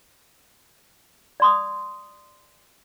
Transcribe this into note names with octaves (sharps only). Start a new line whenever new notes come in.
D5 C6 D#6